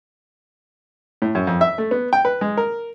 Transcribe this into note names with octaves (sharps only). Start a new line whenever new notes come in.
A2
F#2
F2
E5
A3
B3
G5
B4
G#3
A#4